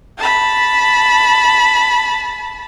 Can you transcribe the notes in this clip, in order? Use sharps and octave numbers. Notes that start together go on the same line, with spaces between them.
A5 B5